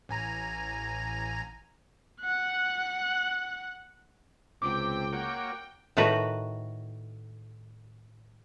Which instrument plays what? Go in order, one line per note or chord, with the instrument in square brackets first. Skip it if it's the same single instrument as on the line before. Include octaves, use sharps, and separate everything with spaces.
[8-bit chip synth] A1 G#5 A#5
[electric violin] F#5 F#6
[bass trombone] C#2 [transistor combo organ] C3 [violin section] G5 [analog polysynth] D6
[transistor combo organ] A#3 F#4 C#5
[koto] A2 D#3 F#4 B4 A#5